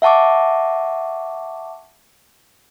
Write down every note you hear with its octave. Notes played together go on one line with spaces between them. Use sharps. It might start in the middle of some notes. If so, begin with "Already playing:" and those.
E5 F#5 A5 C#6 D6